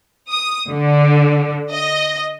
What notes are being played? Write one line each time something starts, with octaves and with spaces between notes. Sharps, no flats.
D#6
D3
D#5